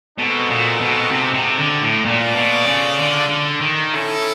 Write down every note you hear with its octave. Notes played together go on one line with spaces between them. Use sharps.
B2 G#3 C4 D#4 F#4 A4
A#2
B2
C3
C3
D3
A2
A#2 F4 A4 D5
B2
C#3
D3
D3
D#3
C#4 E4 A4